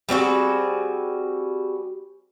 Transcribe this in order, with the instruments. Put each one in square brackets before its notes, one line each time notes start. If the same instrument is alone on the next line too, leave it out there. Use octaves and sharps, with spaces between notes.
[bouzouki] G3 C4 F#4 G#4